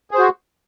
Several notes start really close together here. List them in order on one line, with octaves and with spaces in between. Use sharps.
G#4 C5 F#4